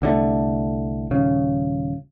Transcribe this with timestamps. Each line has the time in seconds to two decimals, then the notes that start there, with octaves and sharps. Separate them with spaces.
0.02 C2 D3 F3 A3
1.11 D#1 C#3